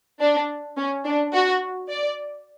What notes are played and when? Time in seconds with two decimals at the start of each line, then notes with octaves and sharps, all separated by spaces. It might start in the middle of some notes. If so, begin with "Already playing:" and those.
0.20 D4
0.77 C#4
1.05 D4
1.33 F#4
1.89 D5